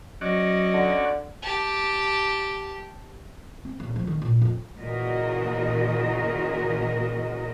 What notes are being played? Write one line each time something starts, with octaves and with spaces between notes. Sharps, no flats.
F#3 C#4 F#4 D5 D#5
D3
G4 A5
C4
D#1
F3
D#3
A#2
F2
A#2 C#3 E3 F#4 A#4 D#5